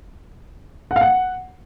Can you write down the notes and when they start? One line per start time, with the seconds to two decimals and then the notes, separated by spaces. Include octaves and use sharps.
0.91 F#5
0.96 F5
1.01 F#5